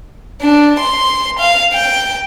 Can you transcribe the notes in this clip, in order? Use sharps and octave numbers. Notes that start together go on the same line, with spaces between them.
D4
C6
F5
G5